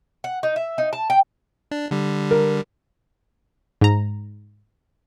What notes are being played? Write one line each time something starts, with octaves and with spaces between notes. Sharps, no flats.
F#5
D#4
E5
D#4
A5
G5
D4
D3 G3
A#4
G#2 A#5